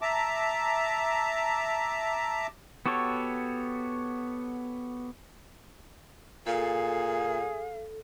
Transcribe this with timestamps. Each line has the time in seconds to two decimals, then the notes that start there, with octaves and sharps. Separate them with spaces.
0.02 E5 A5 A#5 D6
2.86 B3 F#4 G4 A4 C#5
6.47 A#2 G#4 A4 F5